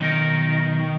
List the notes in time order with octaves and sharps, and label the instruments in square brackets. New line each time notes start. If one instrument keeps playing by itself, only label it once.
[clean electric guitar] B1 D#4 A#4 [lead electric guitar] D#3